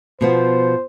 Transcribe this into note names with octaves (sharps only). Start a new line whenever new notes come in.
B2 F3 B3 C5